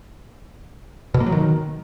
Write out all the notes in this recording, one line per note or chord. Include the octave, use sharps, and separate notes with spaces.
B2
A#3
F#3
D#3